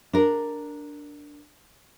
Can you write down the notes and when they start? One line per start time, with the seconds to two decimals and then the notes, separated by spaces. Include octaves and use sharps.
0.13 D4 A#4